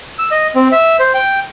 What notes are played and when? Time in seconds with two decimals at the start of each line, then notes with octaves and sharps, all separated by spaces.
0.19 E6
0.31 D#5
0.55 C4
0.72 E5
0.99 C5
1.14 G5